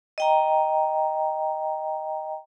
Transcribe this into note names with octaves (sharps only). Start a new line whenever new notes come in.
D#5 G5 A#5